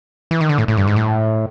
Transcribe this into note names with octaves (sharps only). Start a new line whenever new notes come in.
E3
D#3
D3
A2
A2
G2
G#2
A2